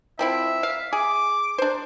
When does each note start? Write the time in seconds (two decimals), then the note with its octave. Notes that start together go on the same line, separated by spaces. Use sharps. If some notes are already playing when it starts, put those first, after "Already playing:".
0.19 F3 C4 E4 E5
0.63 F5
0.93 G#4 D6
1.58 D4 C5